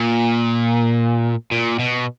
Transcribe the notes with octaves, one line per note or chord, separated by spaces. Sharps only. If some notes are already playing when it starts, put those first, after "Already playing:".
Already playing: A#2
A#2
B2